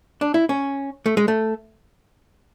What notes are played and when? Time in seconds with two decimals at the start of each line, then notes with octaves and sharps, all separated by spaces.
0.21 D4
0.34 E4
0.49 C#4
1.06 A3
1.17 G#3
1.28 A3